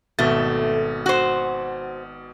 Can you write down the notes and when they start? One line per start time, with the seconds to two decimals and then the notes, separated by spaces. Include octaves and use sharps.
0.19 G#1 B2 A3 A6
1.06 F#4 C5